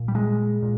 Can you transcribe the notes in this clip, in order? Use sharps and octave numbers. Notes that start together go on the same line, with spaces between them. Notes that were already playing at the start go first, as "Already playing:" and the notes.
Already playing: A#2
G3
G#3
A#2